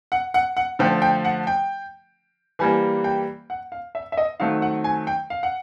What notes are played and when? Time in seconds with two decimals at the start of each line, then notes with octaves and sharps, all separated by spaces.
0.12 F#5
0.34 F#5
0.57 F#5
0.79 D3 F3 A3 G5
1.02 G5
1.25 F#5
1.47 G5
2.59 E3 G3 A#3 G#5
3.04 G5
3.50 F#5
3.72 F5
3.95 E5
4.12 E5
4.17 D#5
4.40 D#3 F#3 A3 C4 F5
4.62 F#5
4.84 G#5
5.07 G5
5.30 F5
5.43 F#5